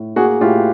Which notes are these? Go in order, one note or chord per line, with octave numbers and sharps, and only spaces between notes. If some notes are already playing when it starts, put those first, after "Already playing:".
Already playing: A2
A#3 F#4 G#4
A2 F4 G4